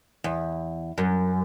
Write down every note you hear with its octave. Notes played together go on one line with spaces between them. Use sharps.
E2
F#2